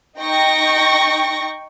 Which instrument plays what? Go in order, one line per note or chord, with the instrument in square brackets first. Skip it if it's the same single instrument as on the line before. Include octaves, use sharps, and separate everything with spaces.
[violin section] D#4 G5 C#6 A#6